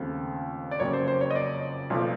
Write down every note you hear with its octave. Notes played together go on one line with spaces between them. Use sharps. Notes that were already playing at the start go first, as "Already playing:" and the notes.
Already playing: D#2 C#3 F3 A3 C4
D5
F#1 F2 C#3 F#3 A#3 C#5
C5
C5
C#5
D#5
D5
B1 A#2 F3 A3